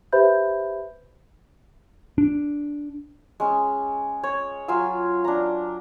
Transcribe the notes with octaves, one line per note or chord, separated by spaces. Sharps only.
G4 B4 C5 E5 B5 G6
D4
G#3 C#4
C#5
F#3 F4 G#5 E6
D4 A#5